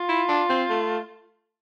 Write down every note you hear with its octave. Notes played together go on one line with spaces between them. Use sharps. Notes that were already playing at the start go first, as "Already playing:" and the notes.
Already playing: F4
E4
D4
C4
A3